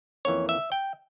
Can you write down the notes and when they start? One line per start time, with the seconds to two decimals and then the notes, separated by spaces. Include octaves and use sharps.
0.25 F2 E3 A#3 C#4 C#5
0.49 E5
0.72 G5